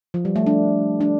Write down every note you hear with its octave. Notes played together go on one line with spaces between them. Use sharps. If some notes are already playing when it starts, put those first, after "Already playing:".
F3
G3
A3
D4
D4